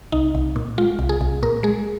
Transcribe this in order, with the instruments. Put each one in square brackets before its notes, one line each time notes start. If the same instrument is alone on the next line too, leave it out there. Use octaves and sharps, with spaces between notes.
[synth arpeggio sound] C2 D#4
C2
A#2
G#3 F4
C2
G#4
C2
A#2 A#4
G#3 G#4